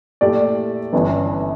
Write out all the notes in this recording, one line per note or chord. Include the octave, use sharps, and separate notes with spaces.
A#2 A3 E4 G4 D5
G1 G2 E3 G3 C#4